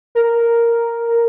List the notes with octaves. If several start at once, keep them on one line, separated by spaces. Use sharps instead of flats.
A#4